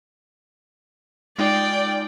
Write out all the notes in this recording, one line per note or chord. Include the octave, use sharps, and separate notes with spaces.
G#3 D#4 F4 D5 G5